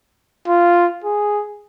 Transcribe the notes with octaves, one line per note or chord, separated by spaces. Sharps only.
F4
G#4